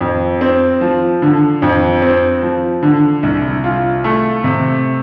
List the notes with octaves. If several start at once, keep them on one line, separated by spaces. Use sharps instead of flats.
F2
C4
F3
D3
F2
C4
F3
D3
C2
F4
A3
C3